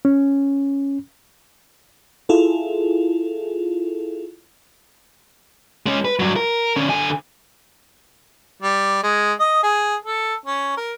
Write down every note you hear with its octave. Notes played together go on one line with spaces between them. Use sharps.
C#4
E4 F4 G#4 A4
G#3 C#4
B4
G2 F#3
A#4
D3 C#4
D3 G#5
G3
G#3
D#5
G#4
A4
C#4
A#4